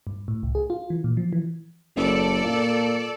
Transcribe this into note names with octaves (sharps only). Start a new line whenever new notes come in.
G2
A2
C2
G#4
F4
E3
A#2
F3
E3
F#1 A4 D5
A#2